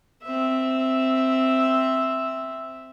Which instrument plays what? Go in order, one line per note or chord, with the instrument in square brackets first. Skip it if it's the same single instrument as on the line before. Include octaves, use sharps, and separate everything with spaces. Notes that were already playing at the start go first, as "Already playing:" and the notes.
[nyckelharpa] C4 E5